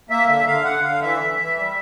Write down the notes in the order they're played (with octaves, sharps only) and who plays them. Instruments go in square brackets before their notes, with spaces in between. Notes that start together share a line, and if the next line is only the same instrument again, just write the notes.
[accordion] A#3 E5
D3 E5
D3 F5
D3 F#5
D3 F5
E3 E5
E3
E3
G3